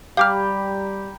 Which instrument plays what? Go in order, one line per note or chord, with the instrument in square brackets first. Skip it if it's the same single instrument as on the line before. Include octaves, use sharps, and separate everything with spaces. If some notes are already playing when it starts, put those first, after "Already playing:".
[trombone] G3 [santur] G4 A#5 B5 [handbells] F5 D6 F6